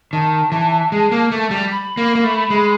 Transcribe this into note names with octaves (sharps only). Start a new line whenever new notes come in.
D#3 A5
E3
G#3
A#3
A3
G3
B5
A#3
A#3
A3
G#3